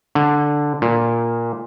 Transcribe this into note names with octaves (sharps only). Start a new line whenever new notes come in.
D3
A#2